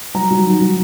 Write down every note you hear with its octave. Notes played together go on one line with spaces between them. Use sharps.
F#3 A#5
F#3
D#3
F#3